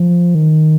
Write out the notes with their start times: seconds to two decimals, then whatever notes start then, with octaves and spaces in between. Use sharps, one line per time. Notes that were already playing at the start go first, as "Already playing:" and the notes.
Already playing: F3
0.35 D#3